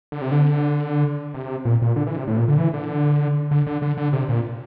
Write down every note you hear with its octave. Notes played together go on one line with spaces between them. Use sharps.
D3
C3
D3
C3
A#2
A#2
D3
E3
C3
A2
A#2
D3
E3
D3
D3
D3
D3
D3
C3
A#2